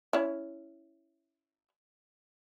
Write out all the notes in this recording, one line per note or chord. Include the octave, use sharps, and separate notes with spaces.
C#4 E4